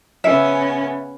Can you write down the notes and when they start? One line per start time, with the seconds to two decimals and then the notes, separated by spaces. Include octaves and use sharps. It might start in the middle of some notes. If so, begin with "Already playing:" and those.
0.24 C#3 B3 C#4 E5